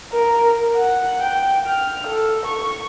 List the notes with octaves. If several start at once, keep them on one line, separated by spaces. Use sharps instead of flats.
A#4
F#5
G5
F6
A4
C#6